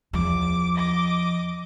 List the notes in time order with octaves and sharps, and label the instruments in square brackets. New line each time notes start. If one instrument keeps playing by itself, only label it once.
[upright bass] E2 F3 [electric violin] D6
[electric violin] D#5 D6